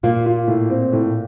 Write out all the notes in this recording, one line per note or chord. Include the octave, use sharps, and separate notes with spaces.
A#2 A#3 F4
F4
A2
C4
A2